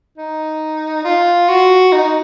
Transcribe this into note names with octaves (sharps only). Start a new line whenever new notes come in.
D#4
F4
F#4
D#4